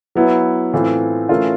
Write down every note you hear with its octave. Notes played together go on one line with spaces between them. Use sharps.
F#3 B3 E4
A2 E3 A3 C4 F4
E3 A3 C#4 F4 A#4